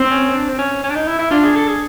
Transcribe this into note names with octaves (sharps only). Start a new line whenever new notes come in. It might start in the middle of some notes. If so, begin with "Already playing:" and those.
Already playing: C4
C#4
D4
C4
C#4
C#4
D4
D#4
E4
E4
D4 F4
G#4
A4
G#4